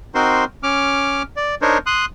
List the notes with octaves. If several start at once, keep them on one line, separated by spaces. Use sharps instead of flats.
C4 D#4 F#4 A#4 C5 C6
C#4 D6 F6
D5
D4 D#4 A#4 C5 C#5
C6 D#6 F#6